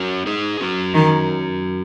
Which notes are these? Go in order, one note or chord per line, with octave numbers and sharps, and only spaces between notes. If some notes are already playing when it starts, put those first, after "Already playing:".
Already playing: C#4 F#4
D#4 G#4
C#4 F#4
D#3